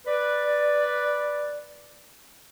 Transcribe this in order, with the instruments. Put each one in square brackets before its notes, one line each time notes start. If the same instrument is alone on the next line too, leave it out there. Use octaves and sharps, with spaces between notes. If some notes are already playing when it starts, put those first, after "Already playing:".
[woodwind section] B4 D5